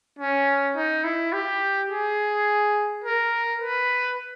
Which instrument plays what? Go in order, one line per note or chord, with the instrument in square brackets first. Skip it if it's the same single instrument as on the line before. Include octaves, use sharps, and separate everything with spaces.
[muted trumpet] C#4
D#4
E4
G4
G#4
A#4
B4